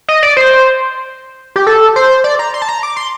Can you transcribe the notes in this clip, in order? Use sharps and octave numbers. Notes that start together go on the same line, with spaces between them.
D#5
D5
C5
G4
A4
C5
D5
A#5
C6
A5
A#5
D6
C6